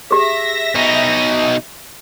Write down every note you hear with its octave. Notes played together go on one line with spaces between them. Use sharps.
G4 G#4 E5 A#6
B2 D#4